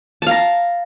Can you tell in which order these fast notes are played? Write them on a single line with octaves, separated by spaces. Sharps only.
A5 F5 A#5